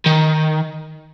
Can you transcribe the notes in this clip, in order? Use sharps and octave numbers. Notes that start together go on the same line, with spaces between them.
D#3